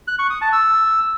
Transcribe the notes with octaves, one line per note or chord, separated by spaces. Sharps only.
F#6
C#6
D#6
A5
E6